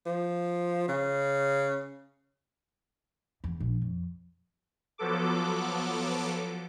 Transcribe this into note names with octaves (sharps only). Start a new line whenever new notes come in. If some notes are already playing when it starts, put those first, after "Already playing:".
F3
C#3
E2
A#1
F2
F3 F#3 B3 A4 D6